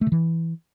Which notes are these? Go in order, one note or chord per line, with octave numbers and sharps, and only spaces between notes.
A3
C#3
E3